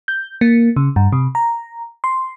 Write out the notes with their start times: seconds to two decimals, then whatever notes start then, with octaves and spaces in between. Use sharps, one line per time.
0.08 G6
0.41 A#3
0.76 C#3
0.96 G2
1.12 C3
1.35 A#5
2.04 C6